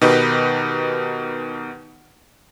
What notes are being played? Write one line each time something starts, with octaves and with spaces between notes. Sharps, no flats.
B2 D#3 D#4 G4 B4